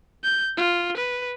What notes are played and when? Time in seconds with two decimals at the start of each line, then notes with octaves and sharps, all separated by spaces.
0.24 G6
0.57 F4
0.97 B4